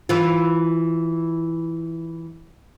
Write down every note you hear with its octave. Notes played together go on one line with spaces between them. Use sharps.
E3 F4